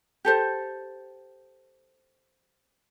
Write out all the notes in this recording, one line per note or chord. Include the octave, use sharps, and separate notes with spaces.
G4 A4 C5